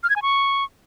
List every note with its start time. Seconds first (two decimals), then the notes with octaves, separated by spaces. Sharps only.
0.03 F6
0.10 G#6
0.16 G#5
0.22 C#6